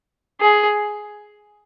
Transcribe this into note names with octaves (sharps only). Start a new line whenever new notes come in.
G#4